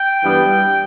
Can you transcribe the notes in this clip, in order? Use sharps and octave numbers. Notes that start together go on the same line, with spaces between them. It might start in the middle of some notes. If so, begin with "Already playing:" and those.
Already playing: G5
G2 E3 G3 B3